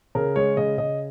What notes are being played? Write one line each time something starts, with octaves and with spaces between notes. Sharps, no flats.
C#3 A#4
G#3 C#5
C#3 D#5
C#3 D#5